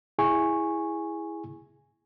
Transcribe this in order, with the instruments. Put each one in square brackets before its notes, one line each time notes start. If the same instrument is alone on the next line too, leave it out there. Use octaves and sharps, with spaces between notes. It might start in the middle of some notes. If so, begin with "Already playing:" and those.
[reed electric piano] E4 G#4 G#5 C#6